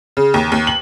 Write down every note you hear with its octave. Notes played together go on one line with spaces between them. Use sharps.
C#3
D#2
D#2
F#7